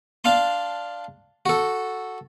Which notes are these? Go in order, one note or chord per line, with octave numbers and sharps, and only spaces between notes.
D4 F5 A5 C6
F#4 A4